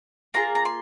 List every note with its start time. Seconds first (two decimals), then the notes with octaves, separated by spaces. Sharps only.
0.34 A#3 F4 G#4 A#5
0.55 A#5
0.65 C6